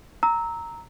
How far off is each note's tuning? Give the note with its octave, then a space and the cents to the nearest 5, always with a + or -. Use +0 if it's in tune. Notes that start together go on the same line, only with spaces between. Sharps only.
A#5 -5 E6 -20